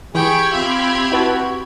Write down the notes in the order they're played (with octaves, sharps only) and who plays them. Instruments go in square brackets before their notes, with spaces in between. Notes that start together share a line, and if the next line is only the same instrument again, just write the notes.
[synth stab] E3 [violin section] G4 B5 G#6 [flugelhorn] G#4 [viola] G5 C#6
[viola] C4 E5 [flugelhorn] F4
[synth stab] E4 B4 A5 [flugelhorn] F#4